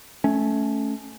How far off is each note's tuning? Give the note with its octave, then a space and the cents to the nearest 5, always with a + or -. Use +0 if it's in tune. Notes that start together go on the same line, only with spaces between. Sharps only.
A3 -15 C#4 +0